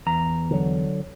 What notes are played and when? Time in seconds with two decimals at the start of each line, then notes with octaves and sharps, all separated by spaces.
0.06 E2 A#5
0.51 D3 F#3